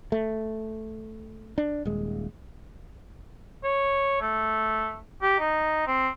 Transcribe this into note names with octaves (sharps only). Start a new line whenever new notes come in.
A3
D4
D#1 G#3
C#5
A3
G4
D#4
C4